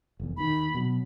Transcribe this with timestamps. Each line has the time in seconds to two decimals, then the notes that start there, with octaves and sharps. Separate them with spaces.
0.20 F1 E2
0.37 D#2 D#3 B5
0.74 B2 F#3